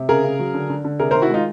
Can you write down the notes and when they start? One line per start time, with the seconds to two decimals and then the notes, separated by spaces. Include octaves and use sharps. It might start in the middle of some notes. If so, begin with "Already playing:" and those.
Already playing: C3
0.09 C#3 G#4 A#4
0.24 C#3
0.39 F#3
0.54 D3
0.70 D3
0.85 D3
0.99 C3 G#4 A#4
1.11 A#4 C5
1.15 D#3
1.22 E4 F#4
1.30 G#3 D#4 F4